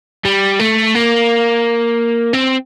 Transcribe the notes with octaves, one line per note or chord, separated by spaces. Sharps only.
G3
A3
A#3
C4